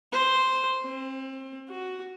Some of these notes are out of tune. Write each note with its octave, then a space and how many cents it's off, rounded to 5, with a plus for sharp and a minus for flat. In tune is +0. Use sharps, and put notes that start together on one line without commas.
C5 +0
C4 +30
F#4 +5